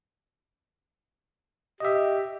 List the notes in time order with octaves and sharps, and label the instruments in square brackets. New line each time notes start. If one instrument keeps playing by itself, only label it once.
[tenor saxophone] G4 [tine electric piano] D#5 E5